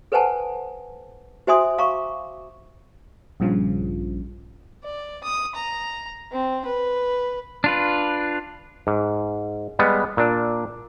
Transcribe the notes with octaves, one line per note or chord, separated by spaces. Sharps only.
A4 B4 C5 F#5 G#5 A5
F#4 C5 E5 G#5 C6 D#6
F5 A#5 C#6 D6
A#1 G2 C#3 F3
D5
D#6
A#5
C4
B4
D4 F4 B4
G#2
G3 G#3 B3
A#2 D4